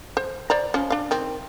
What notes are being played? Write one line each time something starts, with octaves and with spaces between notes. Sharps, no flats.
C5
C5 D5 A#5
F3 C#4
D4 F5
D#3 C4